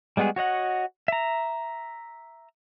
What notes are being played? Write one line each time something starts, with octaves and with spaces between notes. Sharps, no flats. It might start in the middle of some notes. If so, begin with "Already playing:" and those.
G3 G#3 B3 F#4 G#4
F#4 C#5 D#5 F#5
E5 A#5